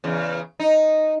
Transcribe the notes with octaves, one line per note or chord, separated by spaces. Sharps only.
E2 C#3
D#4